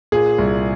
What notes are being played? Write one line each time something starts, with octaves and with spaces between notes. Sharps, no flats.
A#2 G#4
C2